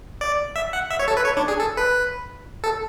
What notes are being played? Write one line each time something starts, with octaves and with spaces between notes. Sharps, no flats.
D5
E5
F#5
E5
C#5
A4
B4
C#5
D4
G#4
A4
B4
A4